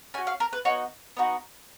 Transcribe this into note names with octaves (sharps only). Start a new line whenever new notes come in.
C#4 F#4 G#5
F5
A#4
B4
B3 D#4 F#4 C#5
B3 D#4 F#4